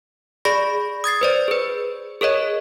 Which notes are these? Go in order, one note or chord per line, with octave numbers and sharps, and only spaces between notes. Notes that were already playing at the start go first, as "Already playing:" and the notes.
G#4 D5 B5 A#6
D#6 G#6 A6 C7
B4 C5 D5
G#4 B4
G#4 A#4 C#5 D#5